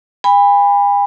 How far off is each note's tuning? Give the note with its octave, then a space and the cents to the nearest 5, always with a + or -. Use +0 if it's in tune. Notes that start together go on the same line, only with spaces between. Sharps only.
G#5 -45 B5 +5